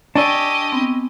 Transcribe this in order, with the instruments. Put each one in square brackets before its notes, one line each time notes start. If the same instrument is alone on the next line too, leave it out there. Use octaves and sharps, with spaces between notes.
[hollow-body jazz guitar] D4 [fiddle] G4 D#5 [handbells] G#5 C#6 E6
[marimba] B3 C4